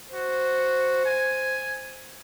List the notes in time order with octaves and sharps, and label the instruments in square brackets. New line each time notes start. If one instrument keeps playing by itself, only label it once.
[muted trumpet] F#4 [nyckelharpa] C5
[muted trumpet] G#5